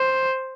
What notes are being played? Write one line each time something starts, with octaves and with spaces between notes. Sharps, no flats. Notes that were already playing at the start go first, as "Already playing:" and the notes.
Already playing: C5